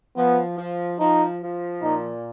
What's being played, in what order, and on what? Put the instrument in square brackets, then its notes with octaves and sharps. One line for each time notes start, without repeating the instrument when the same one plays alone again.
[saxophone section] F3 [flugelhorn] B3
[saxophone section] F3
[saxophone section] F3 [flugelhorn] D#4
[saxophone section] F3
[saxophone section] A#2 [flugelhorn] D#4